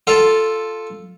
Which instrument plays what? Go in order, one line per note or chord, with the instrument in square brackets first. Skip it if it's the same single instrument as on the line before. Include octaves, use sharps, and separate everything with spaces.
[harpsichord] F4 A4 F5